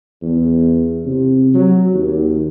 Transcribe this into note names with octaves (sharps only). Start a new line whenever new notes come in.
E2
C3
F#3
D#2